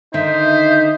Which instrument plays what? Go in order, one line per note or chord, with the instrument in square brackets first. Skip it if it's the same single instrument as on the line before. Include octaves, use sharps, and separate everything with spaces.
[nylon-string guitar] D3 D#3 [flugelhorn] D#4 [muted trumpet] C5 [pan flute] E5